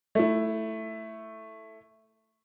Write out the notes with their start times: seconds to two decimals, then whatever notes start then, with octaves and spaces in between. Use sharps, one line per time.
0.15 A3 E4